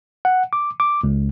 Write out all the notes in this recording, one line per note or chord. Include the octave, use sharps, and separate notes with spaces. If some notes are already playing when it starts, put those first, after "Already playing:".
F#5
D6
D6
C#2